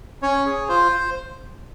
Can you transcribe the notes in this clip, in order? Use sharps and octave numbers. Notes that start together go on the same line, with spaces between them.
C#4 C#5
G#4
F4 C5